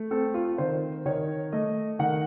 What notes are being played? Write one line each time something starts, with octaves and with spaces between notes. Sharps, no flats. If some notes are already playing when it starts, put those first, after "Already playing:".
Already playing: A3
C4 A4
F4
D#3 C5
D#3 C#5
A3 D#5
D#3 F#5